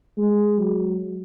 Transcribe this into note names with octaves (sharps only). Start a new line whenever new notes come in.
G#3
F#3